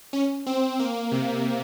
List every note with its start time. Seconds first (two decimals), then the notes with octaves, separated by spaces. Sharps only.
0.13 C#4
0.46 C4
0.80 A#3
1.11 C3